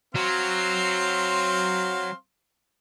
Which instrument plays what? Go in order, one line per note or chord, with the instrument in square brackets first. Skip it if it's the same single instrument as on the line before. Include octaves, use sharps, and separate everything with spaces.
[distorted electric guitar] F#3 [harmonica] C4 F5 C6